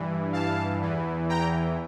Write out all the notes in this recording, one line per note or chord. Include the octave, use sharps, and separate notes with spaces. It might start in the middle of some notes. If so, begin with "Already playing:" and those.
Already playing: G2 E3
F5 A5
E2 E3
G5 A#5